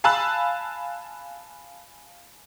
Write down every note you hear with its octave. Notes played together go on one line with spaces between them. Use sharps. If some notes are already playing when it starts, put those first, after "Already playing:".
F5 G#5 A5 B5 E6 F#6